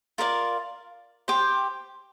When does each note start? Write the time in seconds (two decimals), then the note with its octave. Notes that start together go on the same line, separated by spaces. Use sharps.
0.18 F4 A#4 D5 F5
1.28 G4 C5 G5 D6